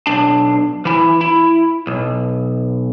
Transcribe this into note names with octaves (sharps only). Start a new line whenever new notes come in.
B1 D4
E3 E4
E4
B1